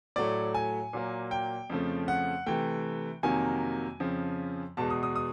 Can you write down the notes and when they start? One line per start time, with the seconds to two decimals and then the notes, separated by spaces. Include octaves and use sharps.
0.16 A2 F#3 A3 D5
0.54 G#5
0.93 A#2 F#3 A#3
1.31 G5
1.70 F2 C#3 F3 A3
2.08 F#5
2.46 C3 E3 A3 G5
3.23 F2 C3 D#3 F#3 A#3 G#5
4.00 F2 C#3 F3
4.77 E2 B2 G#3 A5
4.90 D#6
5.03 D#6
5.16 D#6